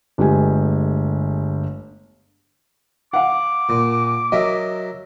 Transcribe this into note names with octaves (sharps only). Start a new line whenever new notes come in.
G1 G#3 A3 G4 G#5
F5 F#5 D6
A#2
F#3 A#4 D#5 E5